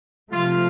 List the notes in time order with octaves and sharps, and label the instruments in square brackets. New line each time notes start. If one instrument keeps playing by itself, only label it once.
[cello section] C3 F3 A3 [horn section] F4